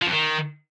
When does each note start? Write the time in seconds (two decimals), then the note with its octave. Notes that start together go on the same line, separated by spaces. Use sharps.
0.02 F3
0.07 F2
0.13 D#3